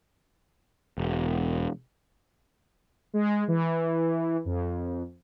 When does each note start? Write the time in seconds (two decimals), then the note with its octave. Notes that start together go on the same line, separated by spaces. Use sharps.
0.98 E1
3.14 G#3
3.48 E3
4.45 F2